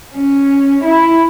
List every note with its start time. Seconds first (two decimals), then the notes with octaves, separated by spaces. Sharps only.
0.14 C#4
0.84 E4